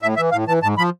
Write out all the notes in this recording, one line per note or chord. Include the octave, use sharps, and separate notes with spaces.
A2 E5
E3 E5
A2 F5
E3 A5
G#2 A5
F3 B5